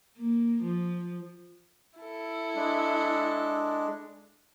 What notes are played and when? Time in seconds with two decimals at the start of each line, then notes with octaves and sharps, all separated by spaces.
0.18 A#3
0.62 F3
1.99 E4 A4
2.55 G#3 D4